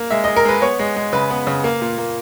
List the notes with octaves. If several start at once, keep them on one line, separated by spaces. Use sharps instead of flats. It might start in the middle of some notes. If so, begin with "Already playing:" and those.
Already playing: A#3
G#3 E5
G#3 D#5
A#4
G#3 B4
B3 C#5
G#3
G#3
C#3 B4
B3
C#3
A#3
A#2
A#3